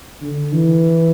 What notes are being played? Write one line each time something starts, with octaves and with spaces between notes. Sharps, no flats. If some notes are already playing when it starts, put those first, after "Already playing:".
D3
E3